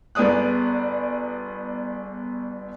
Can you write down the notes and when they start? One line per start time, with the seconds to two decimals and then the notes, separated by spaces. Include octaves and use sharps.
0.15 G1 B3 G#4 D5 D#6 F#6